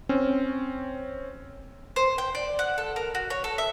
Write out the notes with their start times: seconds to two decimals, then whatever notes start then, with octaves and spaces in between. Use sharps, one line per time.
0.09 C4 C#4
1.96 C5
2.18 G5
2.35 D5
2.59 F#5
2.78 A4
2.96 A#4
3.15 F#4
3.30 C#5
3.44 A4
3.58 E5